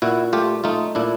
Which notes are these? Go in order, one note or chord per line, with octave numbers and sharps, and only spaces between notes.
A#2 E4 F#4
A3 F4 G4
A3 D#4 F4
A#2 D4 E4